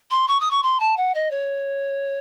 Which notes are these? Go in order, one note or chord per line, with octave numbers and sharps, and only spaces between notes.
C6
C#6
D#6
C#6
C6
A5
F#5
D#5
C#5